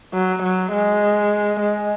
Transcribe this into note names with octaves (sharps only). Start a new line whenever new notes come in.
F#3
F#3
G#3
G#3